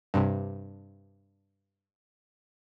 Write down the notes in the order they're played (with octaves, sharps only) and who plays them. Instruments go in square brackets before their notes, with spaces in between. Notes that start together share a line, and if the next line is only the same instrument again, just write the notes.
[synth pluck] G2 C3